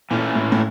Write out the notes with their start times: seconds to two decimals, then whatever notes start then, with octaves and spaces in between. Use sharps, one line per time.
0.11 A#2 E3 A3 C#4
0.35 A2
0.52 A2